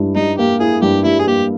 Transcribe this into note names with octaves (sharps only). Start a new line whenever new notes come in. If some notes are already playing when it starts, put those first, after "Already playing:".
Already playing: G2 E4
G3 D#4
A#3 G4
E4 G#4
G2 G4
G3 E4
G#4
A#3 G4